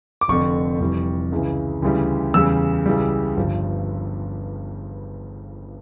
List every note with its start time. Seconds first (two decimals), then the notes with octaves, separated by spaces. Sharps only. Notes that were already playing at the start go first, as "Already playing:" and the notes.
0.21 D6
0.28 F1 F2 D3 C#6
0.80 F1 F2 E3 G3
1.32 C#2 C#3 E3
1.82 D2 C#3 E3 G3
2.34 E2 C#3 G3 E6
2.86 C#2 C#3 E3 G3
3.37 G1 G2 F3